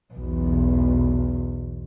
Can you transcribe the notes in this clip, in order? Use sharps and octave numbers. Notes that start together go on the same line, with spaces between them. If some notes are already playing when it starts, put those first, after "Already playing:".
B1 E2